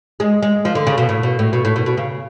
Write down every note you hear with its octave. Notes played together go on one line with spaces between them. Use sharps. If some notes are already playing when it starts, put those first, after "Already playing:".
G#3
G#3
F3
D3
C#3
B2
A2
B2
A2
B2
A2
B2
B2
C#3